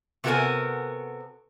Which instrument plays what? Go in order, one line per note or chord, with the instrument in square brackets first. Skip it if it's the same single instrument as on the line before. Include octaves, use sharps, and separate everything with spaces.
[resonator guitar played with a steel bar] C3 B3 F#4 A4 A#4 G#5